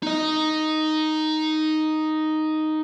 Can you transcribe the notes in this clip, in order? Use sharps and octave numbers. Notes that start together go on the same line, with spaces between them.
D#4 D#5